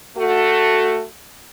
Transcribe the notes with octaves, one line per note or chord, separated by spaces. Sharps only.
A3 F#4